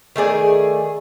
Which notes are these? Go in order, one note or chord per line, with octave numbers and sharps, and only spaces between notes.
D#3 A3 G#4 D5